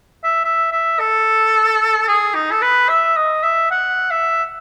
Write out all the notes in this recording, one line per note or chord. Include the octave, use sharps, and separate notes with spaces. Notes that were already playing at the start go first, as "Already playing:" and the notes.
E5
E5
E5
A4
G#4
D#4
A4
B4
E5
D#5
E5
F#5
E5